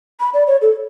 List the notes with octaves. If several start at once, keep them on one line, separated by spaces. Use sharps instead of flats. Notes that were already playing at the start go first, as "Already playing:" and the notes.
B5
D5
C#5
A4